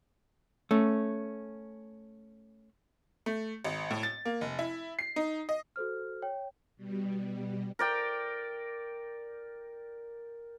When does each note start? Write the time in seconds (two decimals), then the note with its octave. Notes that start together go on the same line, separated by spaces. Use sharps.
0.71 A3 C#4
3.26 A3
3.65 G#1
3.90 A2
4.03 A6
4.25 A#3
4.41 F1
4.59 E4
4.99 C7
5.16 D#4
5.49 D#5
5.76 F#4 A4 C5 F6
6.22 C#5 G5
6.77 B2 G3
7.79 A#4 D5 G5